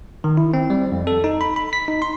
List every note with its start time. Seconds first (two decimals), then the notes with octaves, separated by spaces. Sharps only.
0.24 D#3
0.37 E4
0.54 C4
0.70 G3
0.92 F2
1.07 A4
1.24 D#4
1.41 B5
1.56 B5
1.73 B6
1.88 D#4
2.02 C6